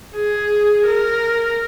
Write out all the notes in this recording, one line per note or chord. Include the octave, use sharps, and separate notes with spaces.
G#4
A#4